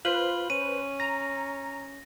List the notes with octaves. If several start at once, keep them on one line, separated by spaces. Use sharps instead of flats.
F4 B4 C5 F#7
C#4 D#7
A#5 A#6